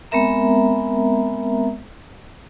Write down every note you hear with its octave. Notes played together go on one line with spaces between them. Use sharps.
G#3 B3 C4 A#4 E5 A#5